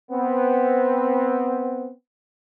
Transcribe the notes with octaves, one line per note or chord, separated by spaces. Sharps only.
B3 C4